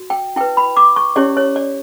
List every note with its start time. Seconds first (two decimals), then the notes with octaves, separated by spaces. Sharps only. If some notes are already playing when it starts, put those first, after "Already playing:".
Already playing: F#4
0.10 G5
0.36 E4 B4 G5
0.57 B5
0.77 D6
0.96 C#6
1.16 C#4 E4 G4 C#5 D5
1.37 C#5
1.56 D5